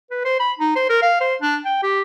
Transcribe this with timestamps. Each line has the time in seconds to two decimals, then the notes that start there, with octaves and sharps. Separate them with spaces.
0.11 B4
0.25 C5
0.40 B5
0.59 D#4
0.76 C5
0.89 A#4
1.02 F5
1.21 C5
1.42 D4
1.65 G5
1.83 G4